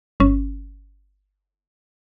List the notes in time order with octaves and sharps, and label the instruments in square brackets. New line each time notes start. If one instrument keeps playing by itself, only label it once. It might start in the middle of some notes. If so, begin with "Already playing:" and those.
[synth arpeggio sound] G1 C#4